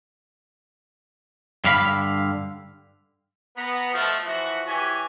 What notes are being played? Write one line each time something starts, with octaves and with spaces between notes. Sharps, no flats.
G2 D3 F5 B5
B3 A#5
B2 F3 A3
E3 F3 E4 F#4
E3 G4 C#5 G#5